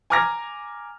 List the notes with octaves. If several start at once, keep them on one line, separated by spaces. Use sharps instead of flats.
G#5 A#5 D6 F6 G#6 A#6